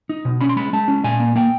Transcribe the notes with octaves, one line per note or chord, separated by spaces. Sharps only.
D#4
B2
C#4 B5
C6
G#3 B5
G#3 A5
C#4
A#2 G#5
A#3
A#3 G5